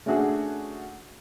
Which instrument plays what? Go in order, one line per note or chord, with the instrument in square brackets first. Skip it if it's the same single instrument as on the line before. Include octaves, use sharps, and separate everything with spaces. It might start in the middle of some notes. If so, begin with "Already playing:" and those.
[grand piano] A3 C#4 D4 F#4 G#4